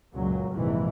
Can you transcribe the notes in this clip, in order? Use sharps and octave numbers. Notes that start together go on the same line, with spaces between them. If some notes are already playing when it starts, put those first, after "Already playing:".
C#2 F#2 A#2 F#3
A#1 F2 G#2 C3 E3